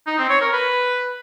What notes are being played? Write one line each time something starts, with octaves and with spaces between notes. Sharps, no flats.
D#4
C4
C#5
A#4
B4